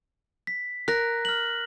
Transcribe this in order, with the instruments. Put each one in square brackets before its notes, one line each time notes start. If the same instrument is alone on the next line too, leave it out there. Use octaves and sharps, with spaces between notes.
[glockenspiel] B6
[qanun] A#4 [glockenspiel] F#6 A#6
[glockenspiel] F6 F#7